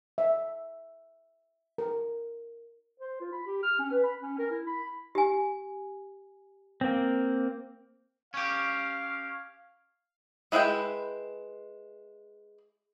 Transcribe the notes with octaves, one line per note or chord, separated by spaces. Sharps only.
E5
A#4
C5
F4
B5
G4
F6
C#4
B4
B5
C#4
A#4
E4
B5
G4 G#5
A#3 C4
C#4 G4 F5
G#3 E4 B4 E5 G5